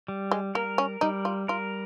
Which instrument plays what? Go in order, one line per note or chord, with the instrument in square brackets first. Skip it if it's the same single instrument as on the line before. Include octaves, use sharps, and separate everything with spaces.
[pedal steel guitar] G3
[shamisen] G#3
[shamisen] A#3 [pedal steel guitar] A#4
[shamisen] C#4
[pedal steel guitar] G3 [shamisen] D#4
[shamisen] F4
[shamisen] F4 [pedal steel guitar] A#4